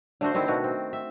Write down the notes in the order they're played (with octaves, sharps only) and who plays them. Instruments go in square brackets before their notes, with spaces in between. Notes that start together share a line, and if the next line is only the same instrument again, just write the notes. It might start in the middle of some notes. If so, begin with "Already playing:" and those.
[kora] D3 A3 F#4 C5
D3 D#3 C4 E4
B2 D#3 F#4
C4
E5